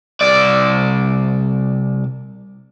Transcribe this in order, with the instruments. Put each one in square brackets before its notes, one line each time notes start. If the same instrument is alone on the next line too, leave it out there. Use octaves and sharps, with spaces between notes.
[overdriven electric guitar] C2 D5